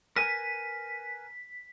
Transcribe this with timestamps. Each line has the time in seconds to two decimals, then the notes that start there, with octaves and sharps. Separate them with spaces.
0.16 A#4 B4 G#5 B6